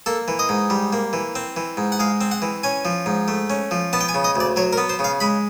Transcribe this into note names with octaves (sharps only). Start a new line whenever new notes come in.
A#3 A4
E3
D#5
G#2
G3
A#3
E3
C4
E3
G#2
F#5
G#3 F5
C4
F#5
E3
C#4 G#5
F3
G#2
A3
C#4
F3
B3 A5
G5
G#5
C#3
D#5
D2 D5
F#3 C#5
A#4
B3
C5
C#3
F5
G#3 B5